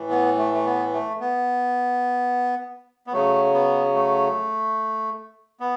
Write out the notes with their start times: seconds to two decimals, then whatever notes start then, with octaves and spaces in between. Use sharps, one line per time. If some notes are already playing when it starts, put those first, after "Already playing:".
Already playing: A2 E3
0.11 B3
0.38 A3
0.54 A3
0.65 B3
0.94 A3
1.20 B3
3.07 B3
3.13 C#3 F#3 A3
3.54 B3
3.95 A3
5.60 B3